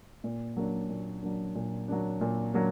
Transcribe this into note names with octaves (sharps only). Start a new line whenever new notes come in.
A#2
F#3 A#3 D4
A#2
F#3 A#3 D4
A#2
F#3 A#3 D4
A#2
F#3 A#3 D4